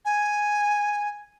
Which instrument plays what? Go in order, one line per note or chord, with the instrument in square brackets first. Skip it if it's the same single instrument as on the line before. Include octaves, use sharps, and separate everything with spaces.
[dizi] G#5